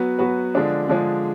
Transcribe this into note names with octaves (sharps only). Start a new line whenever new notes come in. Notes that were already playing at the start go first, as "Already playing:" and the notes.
Already playing: F#3 B3 F#4 B4
F#3 B3 F#4 B4
D3 F3 G#3 D4 G#4
D3 F3 G#3 D4 G#4